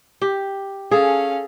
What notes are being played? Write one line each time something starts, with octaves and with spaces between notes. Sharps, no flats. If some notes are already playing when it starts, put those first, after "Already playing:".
G4
C#4 G#4 A4 F5